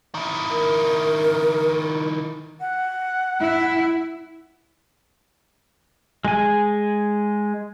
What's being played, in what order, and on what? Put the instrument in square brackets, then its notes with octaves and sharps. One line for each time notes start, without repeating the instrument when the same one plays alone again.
[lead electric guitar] D#3 E4
[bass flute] A#4
[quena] F#5
[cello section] E4
[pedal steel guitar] G#3 G#4 G#5